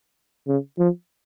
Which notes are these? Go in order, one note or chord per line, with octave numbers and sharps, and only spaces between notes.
C#3
F3